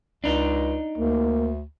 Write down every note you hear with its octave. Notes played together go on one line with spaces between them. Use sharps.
C#2 D4 D#4
D2 A#3